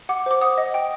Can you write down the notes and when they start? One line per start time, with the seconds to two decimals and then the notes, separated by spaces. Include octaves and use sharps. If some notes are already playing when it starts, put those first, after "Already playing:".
0.09 F#5 D6
0.26 C5 D6
0.42 F#5 D#6
0.58 D#5
0.74 G5